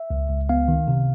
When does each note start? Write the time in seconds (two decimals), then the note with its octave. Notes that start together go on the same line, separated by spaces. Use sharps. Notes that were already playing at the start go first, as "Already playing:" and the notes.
Already playing: E5
0.10 C#2
0.30 C#2
0.49 B3 F5
0.68 D#3
0.88 C3